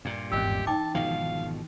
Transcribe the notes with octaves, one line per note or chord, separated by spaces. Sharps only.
G2 A#2
G#1 E2 C#4 G4 D#5 E6
E3 D#4 G5 A5 D6
G#1 B2 F3 F5